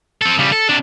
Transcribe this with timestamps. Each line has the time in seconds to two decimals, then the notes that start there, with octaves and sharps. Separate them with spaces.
0.22 C4 A4
0.39 C#3 G3
0.52 A4
0.69 C3 D4